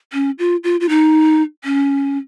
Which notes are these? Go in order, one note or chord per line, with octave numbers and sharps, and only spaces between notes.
C#4
F4
F4
F4
D#4
C#4